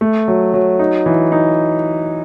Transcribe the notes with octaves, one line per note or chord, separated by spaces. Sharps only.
A3
F#3
F#3
D#4
E3
D#4